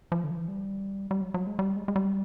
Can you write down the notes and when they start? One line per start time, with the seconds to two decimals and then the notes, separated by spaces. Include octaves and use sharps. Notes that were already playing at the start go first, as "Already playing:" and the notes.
0.12 F3
0.24 D3
0.31 F3
0.36 E3
0.48 G3
1.11 G3
1.21 F#3
1.34 F#3
1.47 G#3
1.59 G3
1.76 G#3
1.88 G#3
1.96 G3